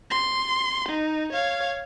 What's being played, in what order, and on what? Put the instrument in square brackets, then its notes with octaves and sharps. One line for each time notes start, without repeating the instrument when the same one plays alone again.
[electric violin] C6
D#4
C#5 F5